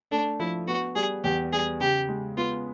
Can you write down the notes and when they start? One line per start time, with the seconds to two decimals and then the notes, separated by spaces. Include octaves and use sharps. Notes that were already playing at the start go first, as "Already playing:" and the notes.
0.11 A3 D4
0.40 F3 E4
0.67 B3 F#4
0.96 G3 G#4
1.24 E2 G4
1.52 G3 G#4
1.80 C#3 G4
2.09 G#3
2.37 B3 F4